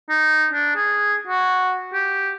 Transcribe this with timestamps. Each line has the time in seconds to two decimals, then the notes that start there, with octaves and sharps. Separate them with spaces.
0.10 D#4
0.52 D4
0.76 G#4
1.28 F#4
1.94 G4